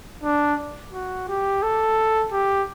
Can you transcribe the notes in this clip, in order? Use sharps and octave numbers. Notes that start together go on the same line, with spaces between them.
D4
F#4
G4
A4
G4